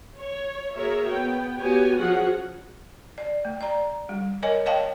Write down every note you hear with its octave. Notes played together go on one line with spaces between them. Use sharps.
C#5
A#3 F#4 G#4 A#4 C#5 E5
B3 G5
B3 F#4 G4 C#5 G#5
F3 C#4 F#4 G#4 F#5
D5
A3
D5 A#5
G3
A#4 C#5 D#5 G#5
C#5 D#5 F5 G5 A5